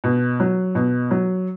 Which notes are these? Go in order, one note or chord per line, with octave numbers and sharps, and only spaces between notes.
B2
F#3
B2
F#3